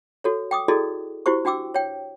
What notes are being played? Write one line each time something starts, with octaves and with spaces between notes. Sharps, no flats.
F#4 A4 C#5
G5 D6 D#6
E4 F#4 G#4 A4 D5 D#5
E4 F#4 G4 C5 C#6
D4 F#4 G5 D6 E6
C#5 G5